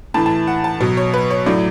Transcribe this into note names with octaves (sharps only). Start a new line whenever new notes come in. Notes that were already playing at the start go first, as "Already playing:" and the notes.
A2 E3 A5
A5
F#5
A5
B2 F#3
C#5
B4
C#5
A2 F#3 D5